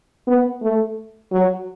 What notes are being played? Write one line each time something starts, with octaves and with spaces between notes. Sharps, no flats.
B3
A3
F#3